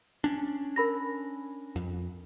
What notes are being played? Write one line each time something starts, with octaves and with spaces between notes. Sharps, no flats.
C#4 D4
A#4 B5 A#6
F2